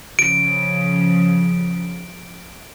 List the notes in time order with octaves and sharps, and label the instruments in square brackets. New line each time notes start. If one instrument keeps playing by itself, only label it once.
[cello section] C#3 F3 [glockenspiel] D7